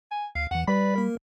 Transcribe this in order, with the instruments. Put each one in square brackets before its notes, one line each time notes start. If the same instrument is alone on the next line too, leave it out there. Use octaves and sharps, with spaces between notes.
[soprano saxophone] G#5
[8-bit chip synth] D2 [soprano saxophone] F5
[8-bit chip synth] E2 E3 [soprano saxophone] F#5
[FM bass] G3 [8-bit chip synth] B4 D5 [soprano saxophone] B5
[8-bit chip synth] A#3 A#4